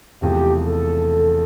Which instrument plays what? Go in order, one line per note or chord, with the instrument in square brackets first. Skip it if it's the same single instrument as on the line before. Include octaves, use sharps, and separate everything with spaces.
[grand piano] E1 E2 C3 F3 A3 [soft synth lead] G4
[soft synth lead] A4